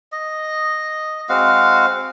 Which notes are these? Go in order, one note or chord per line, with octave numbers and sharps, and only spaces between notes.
D#5
G#3 C4 F#4 F5